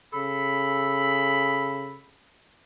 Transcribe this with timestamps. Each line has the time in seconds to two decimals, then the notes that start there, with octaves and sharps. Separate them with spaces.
0.13 C#3 A4 B5